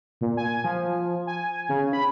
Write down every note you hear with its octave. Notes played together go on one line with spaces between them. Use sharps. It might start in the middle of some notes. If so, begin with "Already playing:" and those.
A#2
G#5
F3
G#5
C#3
B5